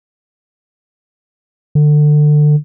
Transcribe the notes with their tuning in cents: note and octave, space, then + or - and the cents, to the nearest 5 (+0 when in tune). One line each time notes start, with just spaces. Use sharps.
D3 +25